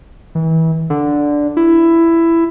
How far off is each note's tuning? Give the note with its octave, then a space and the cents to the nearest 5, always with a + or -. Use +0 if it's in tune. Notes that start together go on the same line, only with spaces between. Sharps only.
E3 -30
D3 -5
E4 +10